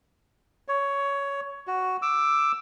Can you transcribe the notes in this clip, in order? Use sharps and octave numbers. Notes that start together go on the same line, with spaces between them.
C#5
F#4
D6 E6